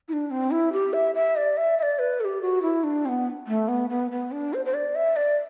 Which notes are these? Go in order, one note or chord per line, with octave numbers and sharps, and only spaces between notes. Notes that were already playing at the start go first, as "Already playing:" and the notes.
E4
D4
C4
E4
G4
E5
E5
D5
E5
E5
D5
B4
A4
G4
F#4
E4
D4
C4
B3
A3
B3
B3
B3
D4
C5
C5
D5
E5
D5